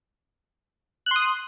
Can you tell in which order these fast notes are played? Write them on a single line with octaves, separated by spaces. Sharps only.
F#6 C6 D#6